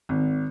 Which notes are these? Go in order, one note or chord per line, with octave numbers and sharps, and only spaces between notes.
G#1